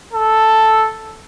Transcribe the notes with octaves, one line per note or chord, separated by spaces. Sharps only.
A4